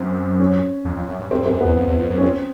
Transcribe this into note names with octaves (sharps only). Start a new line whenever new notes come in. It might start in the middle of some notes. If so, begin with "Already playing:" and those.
Already playing: F#2 C4
C#4
F2
F2
F#2
G2
G2 C4
F#2
C4
F#2
E2 B3
F2
E2
F2
F#2
C#4
F2 C4